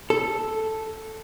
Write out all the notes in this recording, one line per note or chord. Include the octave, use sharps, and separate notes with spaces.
A4